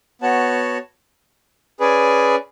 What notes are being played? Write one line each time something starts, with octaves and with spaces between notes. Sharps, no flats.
B3 F#4 C#5 F#5 A5
C#4 G#4 B4 D5 G#5